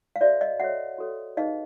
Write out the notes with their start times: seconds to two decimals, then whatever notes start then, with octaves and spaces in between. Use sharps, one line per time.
0.16 F5
0.21 F#4 A4 C5 D5 E5
0.41 D#5 F5
0.60 F#4 A4 C#5 E5 F#5
0.98 F#4 A4 C#5
1.37 D#4 G#4 B4 D#5 F5